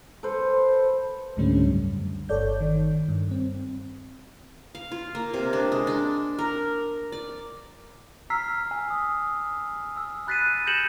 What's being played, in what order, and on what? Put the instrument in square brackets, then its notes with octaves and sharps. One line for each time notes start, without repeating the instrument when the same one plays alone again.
[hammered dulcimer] A4 B4 C5
[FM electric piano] C#2 G#2 D3 G3 A3 C#4
F#2
G1 A4 C#5 D5 G6
D#3
G2
C4
[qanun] F5
F4
A#3
C3
D4
G#3
D4
A#4
D5
[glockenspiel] A#5 E6 F6 B6 C7
G#5
D#6
E6
B5 F#6 A6 B6 C7 D#7
G6 A#6 B6 C#7 E7 F#7